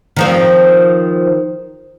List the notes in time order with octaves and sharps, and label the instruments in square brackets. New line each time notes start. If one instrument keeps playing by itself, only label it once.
[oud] D#3 F3 C4